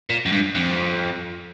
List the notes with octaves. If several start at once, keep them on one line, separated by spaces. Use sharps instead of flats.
A#2
F#2
G2
F2